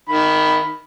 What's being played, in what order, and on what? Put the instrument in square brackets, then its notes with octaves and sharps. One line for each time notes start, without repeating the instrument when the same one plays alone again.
[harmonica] D#3 B5